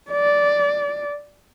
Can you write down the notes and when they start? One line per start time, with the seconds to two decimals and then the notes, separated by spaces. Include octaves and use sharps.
0.11 D5